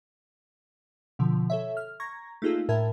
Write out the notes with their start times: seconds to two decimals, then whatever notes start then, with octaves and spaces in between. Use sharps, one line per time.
1.19 B2 D3 F3
1.50 A4 C#5 E5
1.77 F6
2.00 A#5 C#6 G#6 A#6
2.42 A3 A#3 D#4 F4 G#4 A4
2.69 A2 A#4 E5 A5 G#6